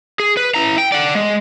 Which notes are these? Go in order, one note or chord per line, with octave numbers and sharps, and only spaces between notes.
G#4
B4
E4 A#5
G5
D5 F#5
G#3